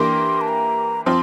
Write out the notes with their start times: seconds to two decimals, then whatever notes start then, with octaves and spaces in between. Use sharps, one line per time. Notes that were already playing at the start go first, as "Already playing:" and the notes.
Already playing: E3 A#3 D4 G4 A#4 C6
0.41 A5
0.48 A#5
1.06 F3 C4 F4 C6